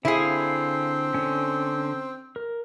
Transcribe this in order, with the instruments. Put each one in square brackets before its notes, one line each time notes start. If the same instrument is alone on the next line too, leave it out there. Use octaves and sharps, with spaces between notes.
[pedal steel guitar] D3 F5 [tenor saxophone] C4 [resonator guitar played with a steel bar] E4 G#4
[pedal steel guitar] D3 C#4
A#4